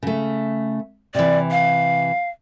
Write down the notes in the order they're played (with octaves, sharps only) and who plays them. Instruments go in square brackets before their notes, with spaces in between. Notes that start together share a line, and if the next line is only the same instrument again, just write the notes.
[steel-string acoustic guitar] C#3 A3
[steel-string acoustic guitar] C3 E3 [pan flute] D5
[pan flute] F5